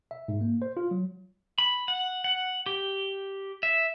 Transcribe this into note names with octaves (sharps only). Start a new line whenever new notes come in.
E5
G#2
A#3
C5
F4
F#3
B5
F#5
F#5
G4
E5